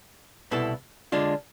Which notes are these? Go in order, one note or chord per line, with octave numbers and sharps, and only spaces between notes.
C2 B2 B3 E4 A4
D3 G#3 D4 F4